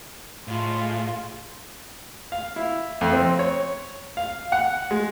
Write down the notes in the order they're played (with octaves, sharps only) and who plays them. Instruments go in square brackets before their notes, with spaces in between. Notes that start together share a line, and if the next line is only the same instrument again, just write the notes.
[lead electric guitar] A2 [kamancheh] G#3 F4
[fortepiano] F5
E4
F2
C4
C#5
F5
F#5
G#3